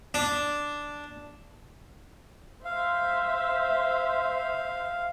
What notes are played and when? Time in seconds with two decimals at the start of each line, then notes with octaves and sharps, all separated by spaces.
0.14 D4
2.65 C5 E5 F5